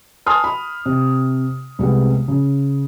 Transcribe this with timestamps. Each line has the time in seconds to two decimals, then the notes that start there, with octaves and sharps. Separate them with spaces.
0.26 G#5 A5 C6 D#6 F6
0.44 B5
0.86 C3
1.79 C2 C3 G3 G#3 B3
2.28 C#3